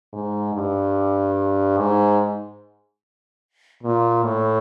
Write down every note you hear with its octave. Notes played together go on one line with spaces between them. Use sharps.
G#2
G2
G#2
A#2
A2